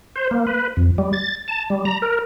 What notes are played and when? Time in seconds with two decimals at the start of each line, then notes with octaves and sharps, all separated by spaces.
0.16 C5
0.31 A#3
0.47 B4
0.77 F2
0.98 G3
1.13 A6
1.48 A5
1.70 G3
1.85 A#5
2.02 A#4